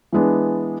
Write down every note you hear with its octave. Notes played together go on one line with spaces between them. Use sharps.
E3 G#3 B3 D4